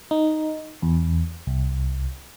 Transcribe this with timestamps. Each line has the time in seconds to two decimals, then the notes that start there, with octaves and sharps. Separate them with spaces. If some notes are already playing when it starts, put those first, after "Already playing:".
0.11 D#4
0.82 E2
1.47 C2